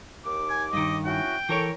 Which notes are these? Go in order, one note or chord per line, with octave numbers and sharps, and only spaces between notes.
D#2 D6
G#5
G2 D#3 D#5
C#4 E4 F#4 G5
E3 A4 A#4 C#5 C#6